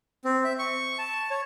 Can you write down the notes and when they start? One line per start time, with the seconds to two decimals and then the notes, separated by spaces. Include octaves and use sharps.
0.25 C4
0.44 E5
0.59 C#6
0.98 A5
1.31 C#5